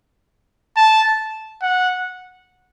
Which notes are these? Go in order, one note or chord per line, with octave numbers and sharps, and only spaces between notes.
A5
F#5